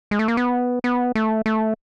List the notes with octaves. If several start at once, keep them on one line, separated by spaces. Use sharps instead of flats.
G#3
A3
A#3
B3
B3
A3
A3